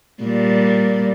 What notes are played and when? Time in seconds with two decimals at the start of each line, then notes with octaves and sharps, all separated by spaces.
0.24 A#2 G3